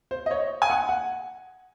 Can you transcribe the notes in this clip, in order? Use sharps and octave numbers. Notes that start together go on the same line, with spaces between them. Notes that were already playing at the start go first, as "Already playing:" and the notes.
C5
D#5
C#5
G#5
F#5
F#5